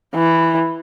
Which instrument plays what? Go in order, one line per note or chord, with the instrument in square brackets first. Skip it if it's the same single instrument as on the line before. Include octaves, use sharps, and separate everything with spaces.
[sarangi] E3